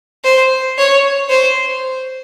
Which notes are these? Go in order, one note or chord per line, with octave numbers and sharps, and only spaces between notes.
C5
C#5
C5